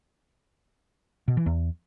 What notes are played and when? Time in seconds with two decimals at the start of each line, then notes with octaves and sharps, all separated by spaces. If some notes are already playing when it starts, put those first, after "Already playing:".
1.28 B2
1.37 E3
1.46 E2